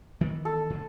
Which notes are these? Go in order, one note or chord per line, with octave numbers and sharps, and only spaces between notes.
D#3 E3 B3
A4
G#2 D3